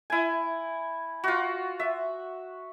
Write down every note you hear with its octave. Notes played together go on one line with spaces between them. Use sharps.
E4 G#5
F4 F#4
E5